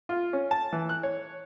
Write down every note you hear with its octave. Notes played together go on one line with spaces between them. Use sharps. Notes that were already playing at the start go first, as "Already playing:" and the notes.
F4
C#4
A5
E3
F#6
C#5